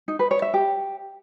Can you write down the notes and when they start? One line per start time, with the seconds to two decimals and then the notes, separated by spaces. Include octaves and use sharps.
0.08 D#4
0.19 B4
0.31 C#5
0.42 E5
0.54 G4